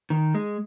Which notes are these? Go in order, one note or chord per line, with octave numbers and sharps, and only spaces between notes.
D#3
G#3